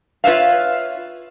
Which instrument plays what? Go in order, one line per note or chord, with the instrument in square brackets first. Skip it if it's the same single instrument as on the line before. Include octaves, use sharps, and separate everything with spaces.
[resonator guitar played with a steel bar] F4 B4 C#5 E5 F5